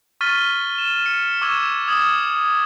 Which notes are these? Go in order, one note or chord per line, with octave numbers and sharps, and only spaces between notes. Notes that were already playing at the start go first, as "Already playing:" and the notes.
C#6 F6 A6 B6 D#7 G7
E7
C#7
C#6 D6 E6 G#6 E7
D#6 G#6 F#7